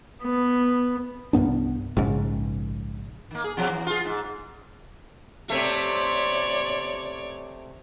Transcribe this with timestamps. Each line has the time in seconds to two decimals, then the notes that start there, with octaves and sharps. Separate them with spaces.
0.23 B3
1.33 C2 G2 B3 D4
1.97 A#1 G#2 C#3
3.31 D#3 A#3
3.44 G#4
3.57 B2 F3 F#3
3.69 E3
3.86 F4 G#4
4.05 G#2
5.50 C3 A3 C#5 D5